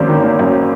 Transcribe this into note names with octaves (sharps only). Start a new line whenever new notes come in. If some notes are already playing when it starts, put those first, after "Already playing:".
Already playing: G#1 F#2 A#3 C5
D#3
A#3
F#2